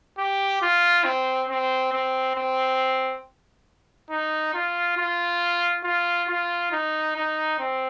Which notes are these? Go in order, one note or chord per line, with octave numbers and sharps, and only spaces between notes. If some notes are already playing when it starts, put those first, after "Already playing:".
G4
F4
C4
C4
C4
C4
D#4
F4
F4
F4
F4
D#4
D#4
C4